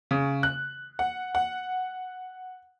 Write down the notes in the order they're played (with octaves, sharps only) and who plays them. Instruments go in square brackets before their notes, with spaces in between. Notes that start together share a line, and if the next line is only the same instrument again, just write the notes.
[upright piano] C#3
F#6
F#5
F#5